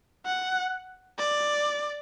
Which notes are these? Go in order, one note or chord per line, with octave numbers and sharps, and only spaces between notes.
F#5
D5